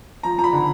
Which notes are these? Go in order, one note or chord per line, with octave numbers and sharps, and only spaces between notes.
F3 A#5
F3 A#5
B5
D3